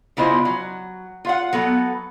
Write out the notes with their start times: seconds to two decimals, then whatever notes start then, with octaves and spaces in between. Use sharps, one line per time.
0.17 C#3 B3 E4 F4 C5 D#5
0.45 F#3
1.25 F4 F5 F#5
1.53 F#3 B3 A4